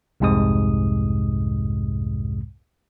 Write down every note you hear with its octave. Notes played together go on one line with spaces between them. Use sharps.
C2 F2 G#2 C3 G#3 D#6